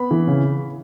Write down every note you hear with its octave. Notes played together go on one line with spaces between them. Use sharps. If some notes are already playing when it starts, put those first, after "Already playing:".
Already playing: B3 B5
E3
C#3